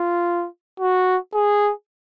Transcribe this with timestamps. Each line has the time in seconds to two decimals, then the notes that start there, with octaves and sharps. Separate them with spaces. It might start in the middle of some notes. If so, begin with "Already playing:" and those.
Already playing: F4
0.80 F#4
1.34 G#4